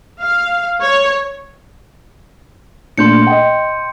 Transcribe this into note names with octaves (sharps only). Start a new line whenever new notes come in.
F5
C#5
A#2 A3 D4 C6 G6 C#7
D#5 G5